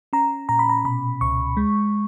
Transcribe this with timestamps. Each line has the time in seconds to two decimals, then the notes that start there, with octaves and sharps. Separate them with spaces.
0.13 C#4 A#5
0.49 A#2 A#5
0.59 B5
0.69 A#5
0.85 B2 B5
1.21 C#2 C#6
1.57 G#3